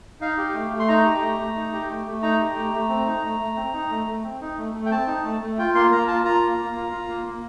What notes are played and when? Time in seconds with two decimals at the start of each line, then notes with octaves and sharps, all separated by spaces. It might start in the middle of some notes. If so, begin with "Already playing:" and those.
0.21 D#4 F5
0.38 G4
0.54 A3
0.71 A3
0.80 C6
0.88 D#4 A#5
1.05 G4
1.22 A3
1.39 A3
1.56 D#4
1.73 G4
1.90 A3
2.06 A3
2.23 D#4 A#5
2.40 G4
2.56 A3
2.73 A3
2.89 C4
3.06 D#4
3.23 A3
3.40 A3
3.56 C4
3.73 D#4
3.90 A3
4.07 A3
4.23 C4
4.41 D#4
4.58 A3
4.74 A3
4.86 G5
4.91 C4 A5
5.07 D#4
5.24 A3
5.41 A3
5.58 F4 G5
5.75 A#3 C6
5.91 A#3 A#5
6.08 F4 A5
6.25 F4 A#5
6.42 A#3
6.58 A#3
6.76 F4
6.92 F4
7.09 A#3
7.26 A#3